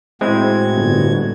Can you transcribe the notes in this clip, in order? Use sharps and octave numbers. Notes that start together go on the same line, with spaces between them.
A2 G#3 C4 E4 F#4 G#6
G1